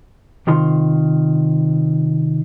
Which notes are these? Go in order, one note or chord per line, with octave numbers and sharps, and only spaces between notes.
C3 D#3 F4 C6